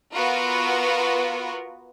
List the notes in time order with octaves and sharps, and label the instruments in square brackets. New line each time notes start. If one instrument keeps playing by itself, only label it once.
[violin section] B3 F4 F#4 A#4 B4